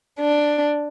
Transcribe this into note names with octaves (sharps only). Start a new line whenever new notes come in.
D4